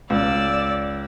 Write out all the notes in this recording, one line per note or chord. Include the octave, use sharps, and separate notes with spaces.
C#2 D5 E6